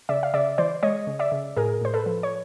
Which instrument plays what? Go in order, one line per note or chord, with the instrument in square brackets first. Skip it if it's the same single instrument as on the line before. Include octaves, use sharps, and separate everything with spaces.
[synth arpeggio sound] C#3 D5 E5
F5
C#3 D5 E5
E3 C5 D5
G#3 C#5 D#5
C#3
D5 E5
C#3
A2 G#4 A#4
A2 C5
A4 B4
F3
C#5